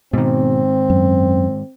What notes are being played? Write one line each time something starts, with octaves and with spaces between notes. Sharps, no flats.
G#2 B2 D#3 C4
F#2